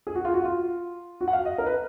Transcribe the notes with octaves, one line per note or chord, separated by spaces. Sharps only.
G#4
F#4
F4
F#4
F4
F#4
F#5
F5
D#5
A#4
B4